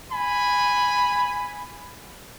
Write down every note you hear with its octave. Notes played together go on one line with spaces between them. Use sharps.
G#5 B5